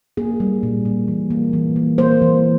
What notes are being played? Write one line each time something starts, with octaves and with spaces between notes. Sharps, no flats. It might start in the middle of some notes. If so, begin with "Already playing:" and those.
A#3 G#4
G3
A#2
A#2
E3
A#3
E3
A#3
A#3 C5
E3